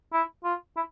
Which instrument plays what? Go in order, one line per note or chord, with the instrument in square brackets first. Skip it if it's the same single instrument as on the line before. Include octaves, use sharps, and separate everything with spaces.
[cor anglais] E4
F4
E4